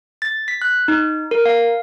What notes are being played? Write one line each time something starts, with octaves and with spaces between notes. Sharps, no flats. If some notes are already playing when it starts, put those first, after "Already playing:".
A6
B6
F#6
D#4
A#4
F5